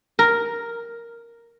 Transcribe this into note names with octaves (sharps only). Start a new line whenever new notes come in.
A#4